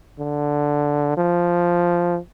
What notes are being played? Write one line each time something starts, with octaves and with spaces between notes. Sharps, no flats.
D3
F3